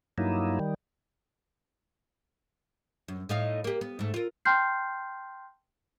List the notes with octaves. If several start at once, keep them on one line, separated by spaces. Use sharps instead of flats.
G2 F#3 A#3 D#4 E4
D#3 G3
F#2
A2 D#4 F5
A#3 G4
B3
G#2 A3
F4 A#4
G5 A5 C6 F6 G6 C7